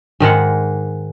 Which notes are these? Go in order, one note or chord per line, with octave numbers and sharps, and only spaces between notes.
G#2 D#3 G#3 F#5